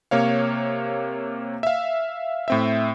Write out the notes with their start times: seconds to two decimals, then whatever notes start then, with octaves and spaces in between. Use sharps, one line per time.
0.11 C3 A#3 C#5 F5
1.63 E5 F5
2.48 A2 C4 E5